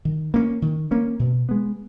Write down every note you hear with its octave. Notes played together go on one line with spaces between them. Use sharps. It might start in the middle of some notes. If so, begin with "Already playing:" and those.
D#3
A#3 C#4
D#3
A#3 C#4
B2
G#3 B3